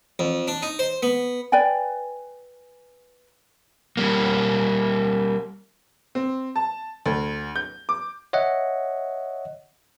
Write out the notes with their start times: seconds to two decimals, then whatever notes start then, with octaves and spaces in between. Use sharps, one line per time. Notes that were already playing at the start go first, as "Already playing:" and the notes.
0.19 F2
0.48 D4
0.62 D#4
0.79 C5
1.03 B3
1.52 B4 D5 G5 G#5
3.97 G3 A#3
6.15 C4
6.56 A5
7.06 D2
7.56 G6
7.89 D6
8.33 C#5 D#5 E5 F#5